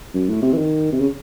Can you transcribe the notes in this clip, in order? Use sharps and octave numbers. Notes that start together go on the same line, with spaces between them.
F#2
A2
C3
E3
D#3
C3
C#3